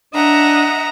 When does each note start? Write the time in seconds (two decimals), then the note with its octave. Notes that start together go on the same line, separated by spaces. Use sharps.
0.15 D4 D#5 E5 F#5 A#5